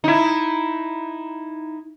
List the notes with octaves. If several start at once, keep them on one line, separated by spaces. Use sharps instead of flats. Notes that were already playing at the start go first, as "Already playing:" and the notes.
D#4 E4